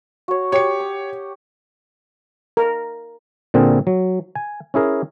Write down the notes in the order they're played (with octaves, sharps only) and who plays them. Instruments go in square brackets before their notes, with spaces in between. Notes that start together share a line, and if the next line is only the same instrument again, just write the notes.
[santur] F#4 C#5
[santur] G4 [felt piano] C#5 C#7
[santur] D#6
[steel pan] A#4
[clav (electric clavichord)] A#2 D3 C4 G#4 A#4
F#3
G#5
C#4 E4 G#4 A#4